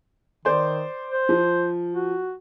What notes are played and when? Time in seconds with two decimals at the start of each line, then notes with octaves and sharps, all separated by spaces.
0.45 D#3 C5 D5 C6
1.11 C5
1.29 F3
1.94 F#4